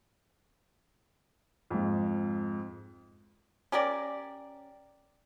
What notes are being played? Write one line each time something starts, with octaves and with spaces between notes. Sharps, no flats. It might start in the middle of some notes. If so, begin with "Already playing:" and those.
F2 G#2
C#4 G4 A#4 D5